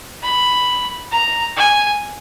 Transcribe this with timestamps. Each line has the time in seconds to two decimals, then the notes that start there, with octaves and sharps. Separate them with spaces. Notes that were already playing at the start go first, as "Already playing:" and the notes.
0.23 B5
1.12 A#5
1.57 G#5